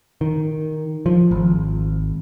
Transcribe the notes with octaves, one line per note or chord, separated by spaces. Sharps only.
D#3
F3
G#1